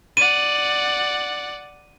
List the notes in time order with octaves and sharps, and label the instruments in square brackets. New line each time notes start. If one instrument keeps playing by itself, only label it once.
[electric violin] D5 F#5 [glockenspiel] D#7